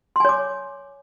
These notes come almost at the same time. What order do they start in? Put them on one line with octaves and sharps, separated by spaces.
C6 G#5 C#5 D6